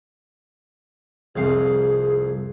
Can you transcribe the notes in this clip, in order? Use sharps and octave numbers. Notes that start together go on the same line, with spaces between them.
C2 F2 G#4 F5